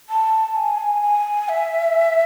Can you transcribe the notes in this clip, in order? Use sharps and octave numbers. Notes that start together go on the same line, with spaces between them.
A5
G#5
G#5
E5